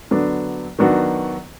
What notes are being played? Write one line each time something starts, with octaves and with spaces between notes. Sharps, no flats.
D3 F#3 B3 D4
D#3 F#3 B3 D4 F#4